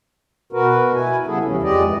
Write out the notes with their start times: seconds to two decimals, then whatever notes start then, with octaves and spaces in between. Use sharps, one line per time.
0.53 B2 F#4 A#4 B4
0.95 E4 G#5
1.27 C#3 G3 B3 E4 G#4 A4
1.44 D#2 C3 E3 C#4
1.63 F2 G#3 G4 D5 D#5
1.84 E2 G2 E3